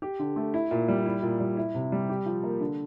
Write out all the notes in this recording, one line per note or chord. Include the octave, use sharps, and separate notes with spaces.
G4
D3
A3
E4
A#2
G3
E4
A#2
G3
E4
C3
G3
G4
F3
A#3
D3